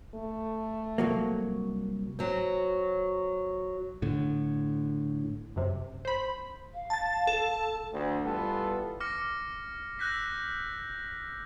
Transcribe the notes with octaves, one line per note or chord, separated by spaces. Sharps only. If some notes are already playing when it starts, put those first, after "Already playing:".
A3
C2 F#3 A#3
F#3 C4
A2 D3
F#2 C3
C5 B5
F5
A5 A6
A4
D2
E3 G3 B3 F4 A4
D6 F6 A#6 C#7
E6 F#6 G6 A#6 B6